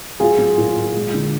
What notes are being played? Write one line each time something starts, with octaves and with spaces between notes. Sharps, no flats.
F#3 F4 G#4
F#3
A#2
A#2
G#3
D3